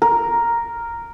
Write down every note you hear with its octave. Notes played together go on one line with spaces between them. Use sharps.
A#4